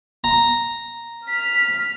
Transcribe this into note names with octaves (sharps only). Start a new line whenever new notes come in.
A#5
F6 B6